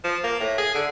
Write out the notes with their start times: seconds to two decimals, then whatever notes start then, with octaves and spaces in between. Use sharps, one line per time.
0.04 F3
0.24 A#3
0.40 A2
0.58 G#4
0.74 D3